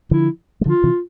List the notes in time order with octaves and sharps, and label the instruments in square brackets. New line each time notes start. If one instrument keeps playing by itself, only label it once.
[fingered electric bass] D3 F3 [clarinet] E4
[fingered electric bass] G#3
[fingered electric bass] D3 F3 [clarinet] F4
[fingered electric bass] C3 E3